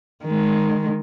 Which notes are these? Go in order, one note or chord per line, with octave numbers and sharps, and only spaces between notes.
D#3 G#3